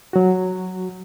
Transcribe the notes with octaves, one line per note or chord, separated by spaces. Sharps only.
F#3 F#4